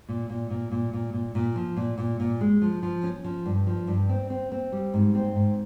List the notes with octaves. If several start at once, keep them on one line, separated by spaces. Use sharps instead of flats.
A#2
A#2
A#2
A#2
A#2
A#2
A#2
F3
A#2
A#2
A#2
G#3
F3
F3
C#4
F3
G2
F3
G2
C4
C4
C4
G3
G#2
C4
G#2